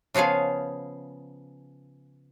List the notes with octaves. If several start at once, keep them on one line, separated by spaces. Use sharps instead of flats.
C#3 F3 B3 G#4 F5